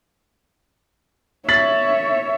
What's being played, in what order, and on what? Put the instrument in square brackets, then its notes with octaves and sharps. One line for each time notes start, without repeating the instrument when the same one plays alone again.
[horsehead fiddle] C#5 E5 [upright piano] A6 B6 F#7